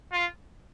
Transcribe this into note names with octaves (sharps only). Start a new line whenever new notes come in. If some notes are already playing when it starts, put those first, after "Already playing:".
F4